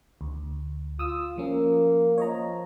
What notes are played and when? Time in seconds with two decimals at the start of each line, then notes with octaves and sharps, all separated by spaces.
0.21 D2
0.99 F4 D#6 E6
1.38 F3 A#3 C#4
2.18 F3 C#5 D#5 A#5